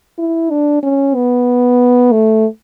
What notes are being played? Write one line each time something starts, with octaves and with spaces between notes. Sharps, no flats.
E4
D4
C#4
B3
A3